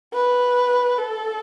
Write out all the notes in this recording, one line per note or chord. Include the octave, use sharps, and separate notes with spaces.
B4
A4